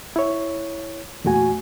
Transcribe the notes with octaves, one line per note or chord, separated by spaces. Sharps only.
E4 C#5
E2 A#2 A3 F#4 G#5